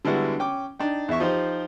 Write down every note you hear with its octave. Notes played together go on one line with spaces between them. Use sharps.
D3 G3 G#3 B3 E4 F#4
C#4 G5 D6
D4 D#4 G5
E2 E4 E5 C#6
F3 D#4 G4 C5